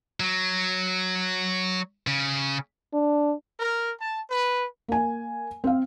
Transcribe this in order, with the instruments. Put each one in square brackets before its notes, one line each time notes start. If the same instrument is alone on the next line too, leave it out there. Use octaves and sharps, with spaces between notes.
[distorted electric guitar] F#3
C#3
[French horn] D4
[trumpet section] A#4
A5
B4
[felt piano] A#3 G#5
C4 F5